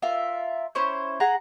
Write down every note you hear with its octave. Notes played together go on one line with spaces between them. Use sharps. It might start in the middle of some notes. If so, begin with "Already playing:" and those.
F4 A#4 E5
C#4 E4 C5 C#6
G#4 F#5 A#5